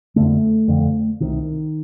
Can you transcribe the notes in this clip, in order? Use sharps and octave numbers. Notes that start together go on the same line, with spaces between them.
F2 D3 A3
F2 D3
C2 C3 D#3